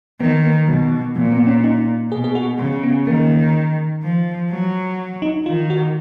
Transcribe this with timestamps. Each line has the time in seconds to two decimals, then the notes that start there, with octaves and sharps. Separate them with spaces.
0.21 D#3 B3
0.44 A#3
0.68 B2 F#3
0.92 D#3
1.16 A#2 F3
1.32 B3
1.47 C#4
1.64 D#4
2.12 B2 G#4
2.24 G#4
2.35 F#4
2.58 C#3
2.83 B3
3.06 D#3 A#3
4.03 F3
4.51 F#3
5.22 D#4
5.46 D#3 F4
5.70 F#4